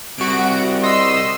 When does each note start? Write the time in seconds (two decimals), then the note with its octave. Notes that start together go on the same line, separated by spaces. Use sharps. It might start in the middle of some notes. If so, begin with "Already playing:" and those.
0.18 C2 F#4 D7
0.83 D#5 C6 E6